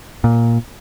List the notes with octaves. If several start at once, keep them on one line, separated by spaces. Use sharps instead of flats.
A#2